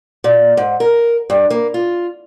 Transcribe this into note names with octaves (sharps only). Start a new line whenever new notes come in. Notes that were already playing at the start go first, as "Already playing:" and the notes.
A#2
G#2
A#4
G2
A#3
F4